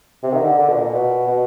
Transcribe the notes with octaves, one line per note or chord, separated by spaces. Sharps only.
C3
D#3
D3
D3
B2
A#2
B2
B2